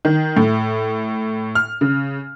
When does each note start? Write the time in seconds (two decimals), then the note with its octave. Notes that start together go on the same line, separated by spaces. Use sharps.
0.05 D#3
0.37 A2
1.55 F6
1.81 C#3